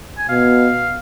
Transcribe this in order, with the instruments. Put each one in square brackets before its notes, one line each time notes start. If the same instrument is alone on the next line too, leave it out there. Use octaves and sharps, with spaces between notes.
[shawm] G#5
[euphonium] B2 [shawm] F5